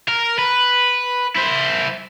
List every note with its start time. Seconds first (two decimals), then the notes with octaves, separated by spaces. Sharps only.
0.09 A#4
0.38 B4
1.35 E4 C5